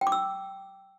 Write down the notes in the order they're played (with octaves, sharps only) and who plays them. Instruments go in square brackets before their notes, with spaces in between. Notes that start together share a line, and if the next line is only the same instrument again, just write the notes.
[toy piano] G5
D6
E6